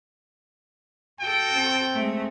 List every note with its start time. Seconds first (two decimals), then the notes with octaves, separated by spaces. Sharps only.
1.20 F#4 A4 G5
1.52 C4
1.93 G#3 A3